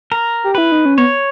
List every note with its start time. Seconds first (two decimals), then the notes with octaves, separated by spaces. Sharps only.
0.12 A#4
0.44 G4
0.55 E4 B4
0.72 D#4
0.85 C#4
0.98 B3 C#5